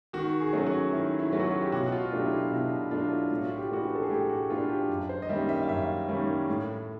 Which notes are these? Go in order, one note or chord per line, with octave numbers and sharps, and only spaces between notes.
D#3 F#4
G#4
F#3 A3 C#4
F#4
D#3 E4
E4
F#3 A3 C#4
F#4
F4
G4
B2 F#4
F#4
F4
F#3 A3 D4 G4
E4
F4
B2 E4
F#3 A3 D4 F4
E4
A2 F4
F#4
F4
G4
E3 A3 D4 F#4
G4
A4
G#4
A2 G4
F#4
E3 A3 D4 F4
G4
F#2
C5
D#5
D#3 G3 A#3 C#4 E5
E5
F5
F#2 E5
D#3 G3 A#3 C#4
A2